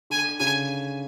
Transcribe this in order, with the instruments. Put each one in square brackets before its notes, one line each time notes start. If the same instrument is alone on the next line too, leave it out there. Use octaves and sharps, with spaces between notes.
[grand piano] D3 [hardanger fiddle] G#5
[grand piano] C#3 [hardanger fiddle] G#5